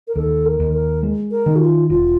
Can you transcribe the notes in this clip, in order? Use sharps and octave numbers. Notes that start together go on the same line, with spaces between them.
A#4
D#2 A4
A#4
D#2
A#4
G#3
A#4
D#3
F#4
F4
E1 F4